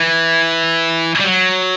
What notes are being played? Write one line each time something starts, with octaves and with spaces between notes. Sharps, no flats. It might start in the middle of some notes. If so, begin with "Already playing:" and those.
Already playing: E3
G3
F#3